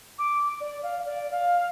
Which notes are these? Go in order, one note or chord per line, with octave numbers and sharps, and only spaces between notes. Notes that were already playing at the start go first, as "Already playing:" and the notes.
D6
D5
F5
D5
F5